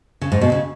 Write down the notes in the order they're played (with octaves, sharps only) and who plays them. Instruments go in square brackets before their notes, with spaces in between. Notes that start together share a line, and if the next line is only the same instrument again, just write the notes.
[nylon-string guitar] C#3
G#2
B2
C#3